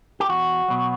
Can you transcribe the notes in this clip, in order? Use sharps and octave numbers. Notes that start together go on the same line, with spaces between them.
G4
E2 F#4
B2 F#3